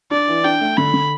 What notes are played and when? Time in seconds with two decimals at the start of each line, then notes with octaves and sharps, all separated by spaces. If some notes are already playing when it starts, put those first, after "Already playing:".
0.11 D4 D5
0.28 E3
0.45 D4 G5
0.61 A3
0.77 D3 B5
0.94 D3